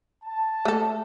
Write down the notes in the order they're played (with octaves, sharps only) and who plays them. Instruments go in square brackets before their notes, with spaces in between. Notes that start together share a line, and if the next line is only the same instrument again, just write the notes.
[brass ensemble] A5
[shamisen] A3 A4